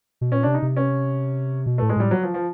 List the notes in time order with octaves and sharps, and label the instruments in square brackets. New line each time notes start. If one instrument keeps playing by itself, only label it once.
[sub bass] B2
[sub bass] A#2 [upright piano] C#4
[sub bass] C3 [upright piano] D4
[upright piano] D#4
[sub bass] C3
[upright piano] C#4
[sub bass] B2
[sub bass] A2 [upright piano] A3
[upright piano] G#3
[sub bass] A2 [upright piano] G3
[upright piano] F#3
F3
F3